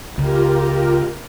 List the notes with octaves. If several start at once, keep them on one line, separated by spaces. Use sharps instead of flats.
C#2 C#3 F4 G4 A#4